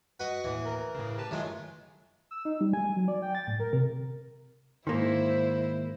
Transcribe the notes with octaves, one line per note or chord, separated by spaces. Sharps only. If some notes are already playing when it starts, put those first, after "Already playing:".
F#4 B4 D#5
D#2 A2 E3
A#4
A2 C#3
G4 B4 A5
A2 D#3 F#3 G#3 F4
E6
D#4
G3
G#5
F#3
D5
G5
A6
A2
A#4
C3
G#2 D#3 G#3 A#3 E4 C5